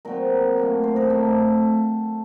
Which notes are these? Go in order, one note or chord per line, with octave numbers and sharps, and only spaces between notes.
A#2 F#3 C4 A#4
A2 F#3 A#3
C5
A#4
A2 A3 C4 A4